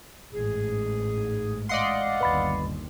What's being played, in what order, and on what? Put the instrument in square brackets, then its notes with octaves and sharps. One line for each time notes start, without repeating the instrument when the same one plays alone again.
[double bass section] A1 G#2 [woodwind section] G#4
[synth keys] D5 D#5 C6 [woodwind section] F5 F#5
[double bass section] G1 D#2 [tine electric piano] B4 B5 A6